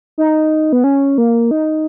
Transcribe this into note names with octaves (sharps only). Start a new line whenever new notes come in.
D#4
B3
C#4
A#3
D#4